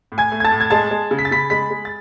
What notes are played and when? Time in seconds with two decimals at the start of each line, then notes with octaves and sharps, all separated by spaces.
0.12 A2
0.18 G#5 G#6
0.32 A3
0.40 G#6
0.45 A5 A6
0.52 A2
0.61 G#6
0.71 G#3 A5 A6
0.91 G#3
1.11 C#3
1.19 B6
1.25 A6
1.31 C#3 B5 B6
1.50 G#3 B5 B6
1.71 G#3
1.85 A6